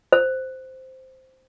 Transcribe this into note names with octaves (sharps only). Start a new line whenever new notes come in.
C5